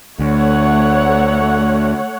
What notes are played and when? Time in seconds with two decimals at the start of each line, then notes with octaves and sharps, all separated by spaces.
0.19 D2 A3 C#5 F#5